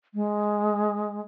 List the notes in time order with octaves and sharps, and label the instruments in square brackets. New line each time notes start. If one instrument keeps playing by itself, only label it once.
[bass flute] G#3